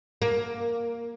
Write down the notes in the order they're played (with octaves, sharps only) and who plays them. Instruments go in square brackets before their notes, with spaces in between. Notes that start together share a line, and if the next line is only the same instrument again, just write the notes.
[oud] A#3